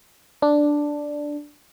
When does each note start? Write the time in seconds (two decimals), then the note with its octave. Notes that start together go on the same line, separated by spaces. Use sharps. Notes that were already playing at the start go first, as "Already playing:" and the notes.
0.42 D4